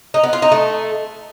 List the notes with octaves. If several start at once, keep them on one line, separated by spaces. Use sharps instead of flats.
D#4
B3
F4
D#4
A3